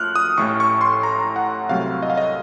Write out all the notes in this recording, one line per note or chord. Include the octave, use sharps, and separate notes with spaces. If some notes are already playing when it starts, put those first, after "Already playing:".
Already playing: F#2 F3 A3 F6 F#6
D#6
A1 A2 A3 C#6
C#6
C6
A#5
F#5
C2 C3 F#3 A3 F5
D#5
F5
D#5